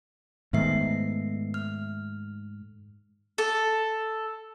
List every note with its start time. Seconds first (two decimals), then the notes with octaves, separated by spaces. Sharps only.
0.53 G#2 D#3 A3 B3 E5 C7
1.54 F6
3.38 A4